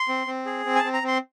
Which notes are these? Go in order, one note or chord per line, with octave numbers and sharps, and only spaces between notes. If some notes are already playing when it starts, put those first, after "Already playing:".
Already playing: C6
C4
C4
G#4
C4
G#5
A5
C4
A#5
C4 C6